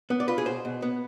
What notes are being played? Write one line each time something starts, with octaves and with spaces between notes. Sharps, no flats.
B3
D5
F4 B4
G#4
B2 C5
B2
B3